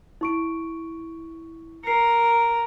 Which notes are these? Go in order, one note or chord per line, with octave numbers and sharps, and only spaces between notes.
E4 C#6 D7
A#4 C7 C#7